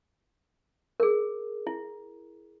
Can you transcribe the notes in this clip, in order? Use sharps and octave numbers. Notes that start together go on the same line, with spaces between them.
G#4 A#4
E4